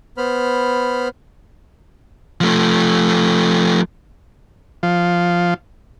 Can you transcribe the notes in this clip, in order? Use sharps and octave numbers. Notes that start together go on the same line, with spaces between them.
B3 C5 B5 F6
F3 A3
F3